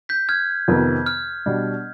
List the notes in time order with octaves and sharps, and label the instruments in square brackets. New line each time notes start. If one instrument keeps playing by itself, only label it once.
[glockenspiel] G6 B6
F6 G#6
[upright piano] F2 C3 D#3 B3
[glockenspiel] F6
[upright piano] B2 G3 D4